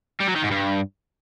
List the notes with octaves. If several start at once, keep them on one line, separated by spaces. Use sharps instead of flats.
G3
F#3
D#3
G#2
G2